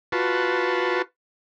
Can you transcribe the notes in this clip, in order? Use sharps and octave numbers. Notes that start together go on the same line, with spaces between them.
F4 F#4 B4 A5